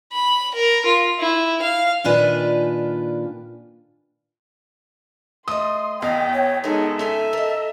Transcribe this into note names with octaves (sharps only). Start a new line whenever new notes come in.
B5
A#4
F4
E4
F5
A#2 D#3 D4 F4 B4 G#5
A3 D#5 C6 D#6
E2 D#5 F5 G5
C#5
G#3 D#4 F#4 A4 A#4
C#4 D#4 A4 E5 G#5
A#4 D#5